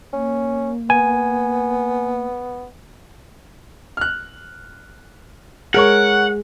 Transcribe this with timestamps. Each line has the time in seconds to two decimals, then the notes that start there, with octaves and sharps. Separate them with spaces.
0.13 A#3 C#4
0.90 B3 G#5
3.97 F6 F#6
5.74 G#3 G#4 A#4 C#5 F#5 C#6